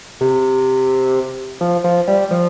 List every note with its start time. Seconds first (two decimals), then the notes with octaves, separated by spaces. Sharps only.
0.21 C3
1.61 F3
1.84 F3
2.08 G3
2.31 F3